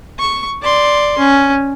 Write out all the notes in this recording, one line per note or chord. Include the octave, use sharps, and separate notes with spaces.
C#6
D5 C6
C#4